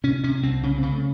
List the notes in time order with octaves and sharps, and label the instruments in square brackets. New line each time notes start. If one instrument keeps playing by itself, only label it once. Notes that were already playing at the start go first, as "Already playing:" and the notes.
[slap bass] C3 C#4
C3 C#4
C2 C4
C#3 C#4
C4
C#3
A3